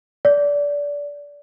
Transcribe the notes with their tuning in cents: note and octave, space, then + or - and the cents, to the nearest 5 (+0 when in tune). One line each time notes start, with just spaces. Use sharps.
D5 -25